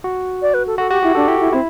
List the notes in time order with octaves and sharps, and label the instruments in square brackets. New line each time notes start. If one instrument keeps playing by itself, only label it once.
[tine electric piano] F#4
[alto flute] D5
B4
A4
[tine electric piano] F#4 [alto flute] A4
[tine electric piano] F#4 [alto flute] G4
[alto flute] E4 [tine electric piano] G4
[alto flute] D4 [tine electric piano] A4
[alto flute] E4 [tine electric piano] G4
[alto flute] E4
[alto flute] C4 [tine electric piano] E4